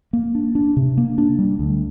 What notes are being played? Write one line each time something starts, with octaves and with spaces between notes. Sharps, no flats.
A#3
D4
D4
C3
A#3
D4
G3
D2